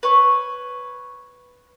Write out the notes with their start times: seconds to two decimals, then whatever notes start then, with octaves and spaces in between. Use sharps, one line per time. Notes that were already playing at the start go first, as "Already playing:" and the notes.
0.03 B4 C#5 C#6